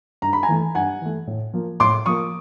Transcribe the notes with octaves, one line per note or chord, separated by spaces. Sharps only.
G2 A#5
B5
G#5 A#5
E3 A3
G2 F#5 G#5
E3 A3
A2
F3 A#3
A2 C6 D6
F3 A#3 C#6 D#6